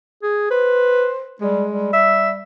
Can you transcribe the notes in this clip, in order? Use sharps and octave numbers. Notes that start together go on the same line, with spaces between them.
G#4
B4 C5
G3 G#3
G3
E5